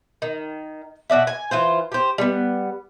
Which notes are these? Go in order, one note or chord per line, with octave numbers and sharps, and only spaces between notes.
D#3
B2 F#4 D5 E5
G#5
E3 F4 C5
G4 C5
G3 B3